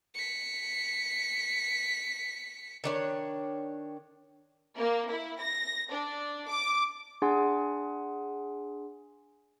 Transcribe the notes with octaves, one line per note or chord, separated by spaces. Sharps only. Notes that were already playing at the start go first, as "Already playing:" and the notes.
B6 C#7
D#3 D4 C#5
A#3
E4
A#6
D4
D6
D4 G#4 F#5 G#5 C6